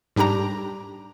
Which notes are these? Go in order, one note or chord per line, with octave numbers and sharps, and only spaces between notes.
G#2 G3 D4 G4 A#5